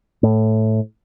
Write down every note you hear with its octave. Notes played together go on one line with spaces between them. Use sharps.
A2